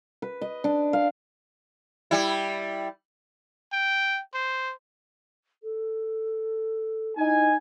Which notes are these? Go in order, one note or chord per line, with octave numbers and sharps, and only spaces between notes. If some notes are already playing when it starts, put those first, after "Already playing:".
B4
D#5
D4
F5
G3 E4
G5
C5
A4
D#4 E4 G#5